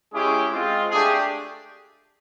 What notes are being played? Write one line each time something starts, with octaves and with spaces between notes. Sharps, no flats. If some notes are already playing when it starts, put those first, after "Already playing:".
G#3 C#4 E4 G4 G#4
G#3 C4 F4
A3 D4 G4 G#4